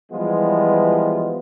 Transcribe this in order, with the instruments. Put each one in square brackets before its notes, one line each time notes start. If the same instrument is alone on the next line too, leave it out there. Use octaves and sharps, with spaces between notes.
[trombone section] E3 F3 G3 G#3 B3 F4